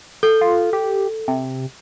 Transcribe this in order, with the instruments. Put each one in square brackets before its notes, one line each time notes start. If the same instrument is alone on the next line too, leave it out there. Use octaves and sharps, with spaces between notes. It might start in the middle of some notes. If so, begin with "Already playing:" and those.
[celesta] A4 [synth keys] G6
[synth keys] F4
G4
C3